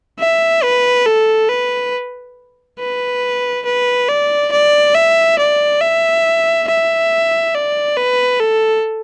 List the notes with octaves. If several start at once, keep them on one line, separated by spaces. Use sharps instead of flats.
E5
B4
A4
B4
B4
B4
D5
D5
E5
D5
E5
E5
D5
B4
A4